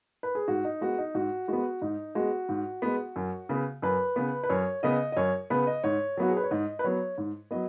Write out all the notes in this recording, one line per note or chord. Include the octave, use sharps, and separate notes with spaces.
B4
G#4
G#2 F#4
D#4
G#3 B3 F#4
D#4
G#2 F#4
G#3 B3 F#4
G#2 D#4
G#3 B3 F#4
G#2
G#3 B3
F#2
C#3 B3
F#2 B4
C#3 B3
B4
F#2 C#5
C#3 B3 D#5
D#5
F#2 C#5
C#3 B3 B4
D#5
G#2 C#5
F#3 B3 F#4
G#4
B4
C#5
G#2 D#5
B4
F#3 B3 C#5
G#2
F#3 B3 D#5